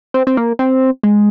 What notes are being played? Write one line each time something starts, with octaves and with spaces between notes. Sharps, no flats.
C4
C4
A#3
C4
G#3